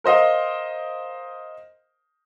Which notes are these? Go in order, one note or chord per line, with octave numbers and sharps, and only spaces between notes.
A#4 C5 D#5 F5